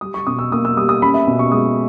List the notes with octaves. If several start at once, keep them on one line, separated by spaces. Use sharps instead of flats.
G3 D#6
C#6
B2 D#6
E6
A#3 D#6
E6
G3 D#6
D#6
C#4 B5
E5
B2
C#6
G#3 D#6